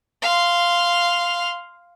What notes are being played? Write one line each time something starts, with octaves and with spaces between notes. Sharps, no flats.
F5 C6